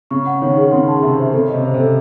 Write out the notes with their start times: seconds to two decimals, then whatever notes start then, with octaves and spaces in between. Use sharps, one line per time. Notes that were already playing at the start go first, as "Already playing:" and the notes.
0.11 C#3 C#6
0.26 F#5
0.42 D#3 C#5
0.57 G#4
0.72 C#3 C6
0.88 A5
1.03 C3 E5
1.18 C5
1.33 C#3 A4
1.48 D#5
1.54 C3
1.65 C5
1.74 C3
1.79 A4